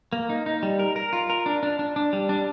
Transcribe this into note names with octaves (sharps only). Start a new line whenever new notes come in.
A#3
D#4
D#4
G3
A#4
A#4
F4
A#4
D4
D4
D4
D4
G3
D4